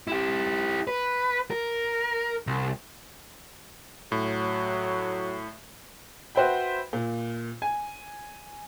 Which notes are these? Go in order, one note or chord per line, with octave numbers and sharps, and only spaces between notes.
E4 G4
B4
A#4
C2
A2 F#3
F#4 B4 C5 E5 G5 B5
A#2
G#5